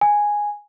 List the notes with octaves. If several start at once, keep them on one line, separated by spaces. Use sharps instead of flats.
G#5